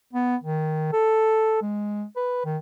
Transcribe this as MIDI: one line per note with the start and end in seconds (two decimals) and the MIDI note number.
0.13 0.36 59
0.44 0.89 51
0.92 1.57 69
1.62 2.04 56
2.16 2.40 71
2.45 2.58 51